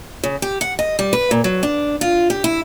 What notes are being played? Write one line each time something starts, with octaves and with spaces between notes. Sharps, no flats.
C#3
G4
F#5
D#5
G3
B4
A#2
F#3
D4
F4
G4
E4